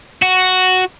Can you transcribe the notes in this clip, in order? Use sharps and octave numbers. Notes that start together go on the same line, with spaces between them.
F#4